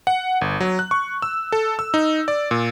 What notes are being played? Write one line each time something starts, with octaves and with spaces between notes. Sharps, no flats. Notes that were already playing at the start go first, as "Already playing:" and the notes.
F#5
G1
F#3
F#6
C#6
E6
A4
E6
D#4
D5
A#2